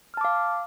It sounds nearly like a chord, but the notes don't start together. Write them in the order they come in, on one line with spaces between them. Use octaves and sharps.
F6 A5 D6 F5